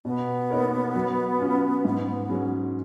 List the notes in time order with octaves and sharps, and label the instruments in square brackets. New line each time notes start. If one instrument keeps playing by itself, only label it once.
[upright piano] B2 [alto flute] B3
[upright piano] A#3 D#4 A#4 C#5
F#3
C#4 F4
G#2
F#3 C#4 G#4